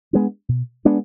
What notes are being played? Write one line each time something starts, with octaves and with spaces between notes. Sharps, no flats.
G#3 B3 D4
B2
G#3 B3 D4